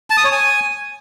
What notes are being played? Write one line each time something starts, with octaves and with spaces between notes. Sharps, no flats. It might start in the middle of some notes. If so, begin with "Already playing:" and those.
A5
D#6
C#5
G#5